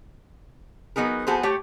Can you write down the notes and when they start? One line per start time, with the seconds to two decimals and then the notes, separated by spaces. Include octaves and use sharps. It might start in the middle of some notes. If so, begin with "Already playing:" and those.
0.96 F#3 B3 D#4 G#4 A#4
1.27 F3 B3 F#4 G#4 A4 C5
1.43 A3 G4 C#5 G5